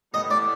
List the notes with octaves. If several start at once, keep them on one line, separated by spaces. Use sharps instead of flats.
A2 E3 G3 B3 D4 D#5
D5